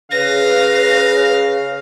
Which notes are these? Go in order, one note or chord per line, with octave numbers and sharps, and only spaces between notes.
C#3 B4 F5 A#6